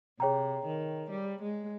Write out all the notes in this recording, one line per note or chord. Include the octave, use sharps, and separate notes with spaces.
C3 G#4 C#5 G5 A#5
D#3
G3
G#3